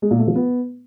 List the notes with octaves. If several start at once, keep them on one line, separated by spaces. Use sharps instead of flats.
G#3
A#2
A3
F3
B3